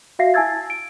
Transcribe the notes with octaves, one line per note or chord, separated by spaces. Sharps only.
F#4 E5 F5 A#6 C7
E4 G#5 A5 E6 G#6 A6
D7